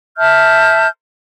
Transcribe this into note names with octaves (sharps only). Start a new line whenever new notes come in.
E5 A5 F6 G6